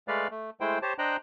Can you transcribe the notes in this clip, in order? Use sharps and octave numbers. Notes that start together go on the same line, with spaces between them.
G#3 A3 B4 D5 F5
A3
G#3 A3 E4 C5 G5
G4 C5 C#5 A5
D4 C5 D#5 G5 A#5 F#6